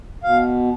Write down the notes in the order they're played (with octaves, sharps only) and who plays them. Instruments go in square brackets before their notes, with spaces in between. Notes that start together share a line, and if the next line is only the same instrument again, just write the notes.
[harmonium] B2 F5